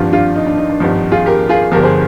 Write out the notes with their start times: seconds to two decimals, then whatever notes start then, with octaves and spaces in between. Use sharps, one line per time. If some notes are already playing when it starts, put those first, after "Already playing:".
Already playing: G#1 G2 F3 D4 F4
0.12 D4 F4
0.36 D#4
0.46 D4
0.57 D#4
0.69 D4
0.80 G#1 G2 F3 D#4
1.11 F4 G#4
1.26 G4 A#4
1.49 F4 G#4
1.72 G1 G2 F3 G4 A#4
1.83 G#4 C5